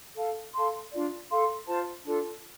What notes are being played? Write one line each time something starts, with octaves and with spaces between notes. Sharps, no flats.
A4 F5 A5
A4 F5 A5 C6
D4 F4 D5
A4 F5 C6
F4 C5 A5
D4 F4 A4